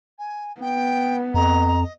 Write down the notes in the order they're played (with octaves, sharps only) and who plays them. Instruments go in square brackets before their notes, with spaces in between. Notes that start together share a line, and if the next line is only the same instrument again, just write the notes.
[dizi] G#5
[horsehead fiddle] B3 [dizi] G5
[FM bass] F2 [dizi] D#5 [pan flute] A#5